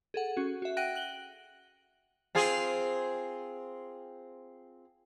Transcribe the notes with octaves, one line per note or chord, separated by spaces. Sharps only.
G#4 A4 F#5
C#4 F#4
F#4 E5
F#5 G5 F#6 A#6 D7 D#7
F#6 F#7 G7
C4 F4 G#4